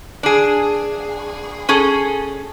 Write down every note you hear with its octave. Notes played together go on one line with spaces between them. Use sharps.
D4 G#4
C#4 G#4 A4